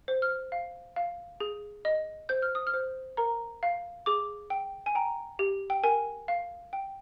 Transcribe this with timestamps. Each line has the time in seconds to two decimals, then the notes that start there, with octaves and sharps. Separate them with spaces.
0.08 C5
0.22 F6
0.52 F5
0.96 F5
1.40 G#4
1.85 D#5
2.29 C5 G6
2.42 F6
2.55 D#6
2.67 F6
2.74 C5
3.17 A#4 A#5
3.63 F5
4.06 G#4 D6
4.50 G5
4.86 G#5
4.95 G5 A#5
5.39 G4
5.70 G5
5.83 A#4 G#5
6.28 F5
6.73 G5